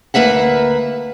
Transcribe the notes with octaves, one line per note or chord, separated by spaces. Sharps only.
D2 A#3 B4 E5 F#5